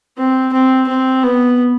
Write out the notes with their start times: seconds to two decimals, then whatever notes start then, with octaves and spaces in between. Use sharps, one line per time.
0.17 C4
0.53 C4
0.88 C4
1.23 B3